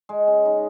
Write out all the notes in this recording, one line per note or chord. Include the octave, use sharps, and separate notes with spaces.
G#3
C#3
D#4